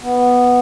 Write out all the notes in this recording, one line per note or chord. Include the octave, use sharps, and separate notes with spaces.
B3